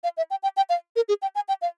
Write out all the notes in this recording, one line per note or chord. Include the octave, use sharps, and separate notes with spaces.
F5
E5
G5
G5
G5
F5
A#4
G#4
G5
G#5
G5
F5